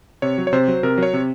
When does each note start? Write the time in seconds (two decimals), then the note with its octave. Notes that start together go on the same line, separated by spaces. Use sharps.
0.22 C3 C#5
0.38 F#3
0.47 C#5
0.53 C3 C5
0.68 F#3
0.83 C3 A#4
0.98 F#3
1.03 C#5
1.14 C3